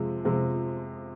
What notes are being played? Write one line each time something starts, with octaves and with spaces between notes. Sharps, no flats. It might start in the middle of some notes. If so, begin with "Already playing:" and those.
Already playing: F2 C3 F3 G#3
F2 C3 F3 G#3